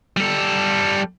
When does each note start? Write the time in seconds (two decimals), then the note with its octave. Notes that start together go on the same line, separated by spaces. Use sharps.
0.17 G3 A4